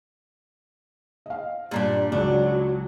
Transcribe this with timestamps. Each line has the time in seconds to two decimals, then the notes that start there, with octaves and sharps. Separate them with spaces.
1.26 D#5 F5
1.71 G2 A#2 G3 D4
2.12 C#2 F#3 D4